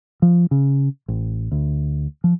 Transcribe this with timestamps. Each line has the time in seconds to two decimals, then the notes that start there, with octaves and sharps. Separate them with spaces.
0.22 F3
0.51 C#3
1.08 A1
1.52 D2
2.24 F3